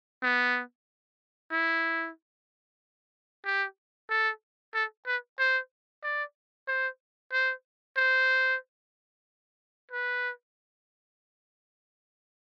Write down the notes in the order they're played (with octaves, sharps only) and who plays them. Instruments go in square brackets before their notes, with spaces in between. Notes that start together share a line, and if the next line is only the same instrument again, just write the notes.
[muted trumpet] B3
E4
G4
A4
A4
B4
C5
D5
C5
C5
C5
B4